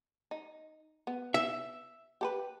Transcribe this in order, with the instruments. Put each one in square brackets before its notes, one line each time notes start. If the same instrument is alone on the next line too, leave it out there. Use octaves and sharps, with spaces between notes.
[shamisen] D#4
B3
[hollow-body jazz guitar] E5
[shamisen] G4 A4 B4